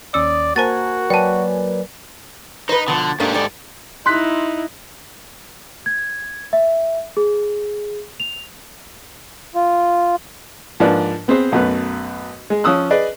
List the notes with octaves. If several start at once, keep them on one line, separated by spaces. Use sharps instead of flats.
D#2 C#4 D5 D#6 E6 C#7
A#3 F#4 A#4 C5 G#5 A5 A6
F#3 B4 D5 G5 A5
D#4 B4 C5
B2 D3 F3
G#2 A3 A#3 D4 G4
A4 D5
D#4 E4 C6 F#6 B6
G#6
E5
G#4
F7
F4
G#2 F3 A#3 D4 B4 D5
B3 C4 G#4 B4 C5
B1 F#2 B2 A3 B4
G#3 G#4
F3 C#4 D#6 E6 F#6
G#4 B4 D5 D#5